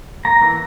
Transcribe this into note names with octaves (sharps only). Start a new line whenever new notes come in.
A#3 A#5
E3